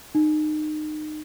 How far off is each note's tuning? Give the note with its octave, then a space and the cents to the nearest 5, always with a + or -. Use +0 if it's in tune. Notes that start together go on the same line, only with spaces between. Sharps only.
D#4 -25